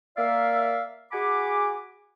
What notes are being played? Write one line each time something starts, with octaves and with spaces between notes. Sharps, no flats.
A#3 D5 E5 F5
F#4 G#4 F#5 G#5 B5 D6